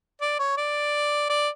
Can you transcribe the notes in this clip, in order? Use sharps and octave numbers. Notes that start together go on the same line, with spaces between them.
D5
C#5
D5
D5